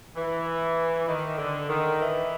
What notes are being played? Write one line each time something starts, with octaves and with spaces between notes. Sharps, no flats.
E3
D#3
D3
D#3
E3